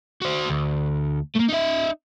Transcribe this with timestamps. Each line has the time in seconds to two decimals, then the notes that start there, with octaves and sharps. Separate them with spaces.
0.22 F#4 C5
0.49 D2
1.36 A3 A#3
1.50 D#4 E5